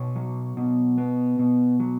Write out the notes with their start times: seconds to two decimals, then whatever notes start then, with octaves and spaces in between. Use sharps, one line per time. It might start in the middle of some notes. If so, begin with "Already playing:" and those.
Already playing: B2 C#5
0.16 F#3
0.57 B2
0.98 B3
1.39 B2
1.80 F#3